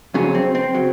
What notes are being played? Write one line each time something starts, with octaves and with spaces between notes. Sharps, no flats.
F2 C#3 F#3 C#4
C4
C4
C#3 F#3